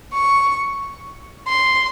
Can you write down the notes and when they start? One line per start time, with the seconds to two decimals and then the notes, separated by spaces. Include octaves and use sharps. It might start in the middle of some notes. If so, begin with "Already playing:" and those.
0.14 C#6
1.48 C6